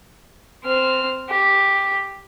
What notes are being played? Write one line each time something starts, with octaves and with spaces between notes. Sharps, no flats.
C4 F6
G4